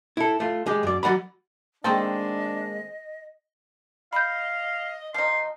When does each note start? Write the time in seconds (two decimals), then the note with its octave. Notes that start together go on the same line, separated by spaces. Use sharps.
0.17 E4 A4
0.40 A3 F4
0.66 G#3 G4
0.83 F#2 D5
1.03 F#3 D5 F#5 B5
1.84 D#3 G#3 A#3 C4 D4 A4 D#5
4.13 D#5 F5 B5 G6
5.14 F3 D#4 C6